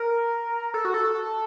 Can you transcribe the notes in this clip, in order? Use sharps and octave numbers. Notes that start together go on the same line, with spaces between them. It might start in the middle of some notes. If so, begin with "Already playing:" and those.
Already playing: A#4
A4
F#4
A4